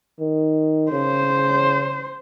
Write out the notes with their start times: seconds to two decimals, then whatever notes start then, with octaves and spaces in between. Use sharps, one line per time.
0.20 D#3
0.92 C#3 C5